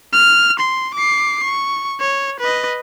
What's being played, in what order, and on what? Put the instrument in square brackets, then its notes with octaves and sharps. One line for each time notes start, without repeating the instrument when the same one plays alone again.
[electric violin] F6
C6
D6 C7
C#6
C#5
B4 D#5